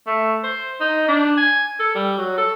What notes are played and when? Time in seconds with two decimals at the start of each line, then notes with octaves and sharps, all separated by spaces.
0.07 A3
0.44 C5
0.80 D#4
1.08 D4
1.37 G#5
1.79 A4
1.95 G3
2.18 F#3
2.37 A4